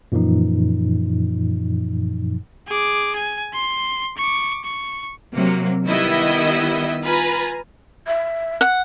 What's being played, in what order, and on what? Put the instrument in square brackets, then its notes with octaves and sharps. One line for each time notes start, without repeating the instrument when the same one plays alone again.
[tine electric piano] F#2 A#2 E3 F3 D#4
[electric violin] G#4 D6
G#5
C6
C#6 D6
C#6
[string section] C3 F#3 A#3
D#3 G3 B3 E4 D#5 E5
F4 B4 G#5 A#5
[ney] E5
[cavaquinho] F#5